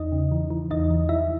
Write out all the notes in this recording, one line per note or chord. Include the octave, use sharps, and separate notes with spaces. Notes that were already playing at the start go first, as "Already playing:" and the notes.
Already playing: E2 D#4 D#5
C#3
E3
E3
E2 D#4 D#5
E3
E3 E4 E5